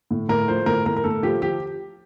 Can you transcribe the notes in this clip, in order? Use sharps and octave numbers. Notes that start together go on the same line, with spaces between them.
A2
A2 A#4
F3 C5
A2 A#4
A2 A#4
A#4
A2 A4
F3 G4
F3 G4